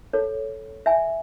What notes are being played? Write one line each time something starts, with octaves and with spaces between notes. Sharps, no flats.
A4 C#5
E5 G#5